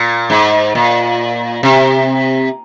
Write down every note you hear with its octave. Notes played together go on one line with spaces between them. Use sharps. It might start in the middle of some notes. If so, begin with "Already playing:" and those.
Already playing: A#2
G#2
A#2
C3